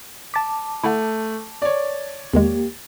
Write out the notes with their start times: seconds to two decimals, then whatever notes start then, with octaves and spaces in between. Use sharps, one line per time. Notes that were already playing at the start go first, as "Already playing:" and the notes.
0.34 A5 D6 A6 B6
0.84 A3 E4 F#5
1.62 C#5 D5
2.34 E2 D#3 G#3 A#3 G4